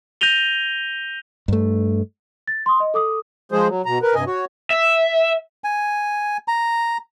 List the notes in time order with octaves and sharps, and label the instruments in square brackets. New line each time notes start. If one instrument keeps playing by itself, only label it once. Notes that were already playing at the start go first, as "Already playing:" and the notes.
[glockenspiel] G6 A#6 D#7 F7 G7
[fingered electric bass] G2 A3
[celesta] A6
C6 D#6
D#5
A4 D6 D#6
[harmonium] F3 G#3 G#4 C5
F#3
B2 A#5
A#4 B4
G2 C3 D#5 G#5
F#4 C#5
[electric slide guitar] E5
[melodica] G#5
A#5